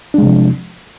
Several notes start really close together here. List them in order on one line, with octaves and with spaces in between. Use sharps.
D4 G#3 C3 F3